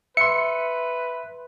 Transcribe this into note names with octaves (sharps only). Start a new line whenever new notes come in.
B4 E5 C6 C#7